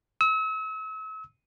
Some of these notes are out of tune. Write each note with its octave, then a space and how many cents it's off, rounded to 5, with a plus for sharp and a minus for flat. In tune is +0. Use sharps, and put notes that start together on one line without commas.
E6 -40